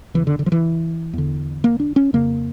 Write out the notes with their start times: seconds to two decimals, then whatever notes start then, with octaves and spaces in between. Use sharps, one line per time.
0.14 E2 C#3 E3
0.27 D3
0.39 D3
0.46 F3
0.52 E3
1.13 E2 D3
1.64 A#3
1.80 D4
1.96 C#4
2.13 F2 C#3 A#3